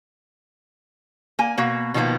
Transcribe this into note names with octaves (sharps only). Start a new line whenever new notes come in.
A#3 G#5
B2 A#3 F#4
B2 D#3 F3 G3 A#3 B3